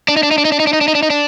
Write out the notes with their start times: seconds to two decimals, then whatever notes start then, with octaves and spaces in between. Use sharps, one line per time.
0.08 D4
0.16 D#4
0.23 D4
0.31 D#4
0.38 D4
0.45 D#4
0.52 D4
0.60 D#4
0.67 D4
0.73 D#4
0.81 D4
0.88 D#4
0.95 D4
1.03 D#4
1.10 D4